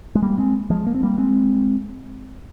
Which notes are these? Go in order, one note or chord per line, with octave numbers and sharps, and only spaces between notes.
G#3
G3 A#3
G#3 C4
F3 G#3
A#3
C4
G3 A#3
G#3 C4